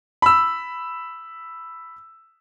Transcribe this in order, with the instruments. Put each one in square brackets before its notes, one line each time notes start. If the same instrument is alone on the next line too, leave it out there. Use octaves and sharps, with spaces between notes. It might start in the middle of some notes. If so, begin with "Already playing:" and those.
[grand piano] B5 E6